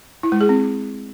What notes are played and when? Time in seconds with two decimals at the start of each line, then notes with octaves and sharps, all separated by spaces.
0.23 E4
0.32 G#3
0.41 G#4
0.49 C4